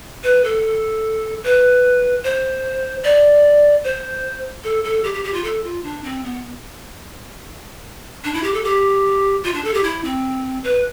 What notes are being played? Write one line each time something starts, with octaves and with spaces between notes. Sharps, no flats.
B4
A4
B4
C5
D5
C5
A4
A4
G4
G4
G4
F4
A4
F4
D4
C4
B3
D4
E4
G4
A4
G4
F4
D4
A4
G4
E4
C4
B4